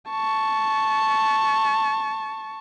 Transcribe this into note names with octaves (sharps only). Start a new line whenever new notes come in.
A5 C#6